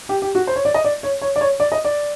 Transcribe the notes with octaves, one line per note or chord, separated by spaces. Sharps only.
G4
G4
F#4
C5
C#5
D5
D#5
D5
C#5
C#5
D5
C#5
D5
D#5
D5